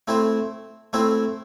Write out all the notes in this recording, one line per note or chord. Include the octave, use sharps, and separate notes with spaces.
A3 C4 E4 C5
A3 C4 E4 C5